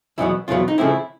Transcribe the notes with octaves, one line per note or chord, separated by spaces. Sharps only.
E2 B2 F#3 B3 E4
E2 B2 F#3 B3 F4
D#4
C#3 F3 A3 C4 E4